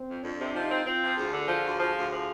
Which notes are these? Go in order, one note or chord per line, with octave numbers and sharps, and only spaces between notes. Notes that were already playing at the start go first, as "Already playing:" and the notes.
Already playing: C4
F2
F2 D4
C3
F3 D#4
C4
C4 F4
F3
D2 G#4
D3
F3
D2
F3
D2
F3